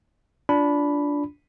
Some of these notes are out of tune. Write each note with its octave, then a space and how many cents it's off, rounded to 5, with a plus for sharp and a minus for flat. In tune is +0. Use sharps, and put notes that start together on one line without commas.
D4 -15 F4 +0 B5 +0